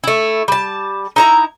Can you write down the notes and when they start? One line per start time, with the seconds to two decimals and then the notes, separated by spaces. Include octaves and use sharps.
0.04 A3 E4
0.48 G3 A5
1.16 D#4 E4 A#5